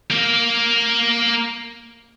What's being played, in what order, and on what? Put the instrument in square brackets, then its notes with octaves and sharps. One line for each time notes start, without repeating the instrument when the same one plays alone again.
[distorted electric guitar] A#3 A#4